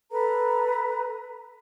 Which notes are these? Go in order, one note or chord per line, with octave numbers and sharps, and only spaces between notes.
A4 B4 A#5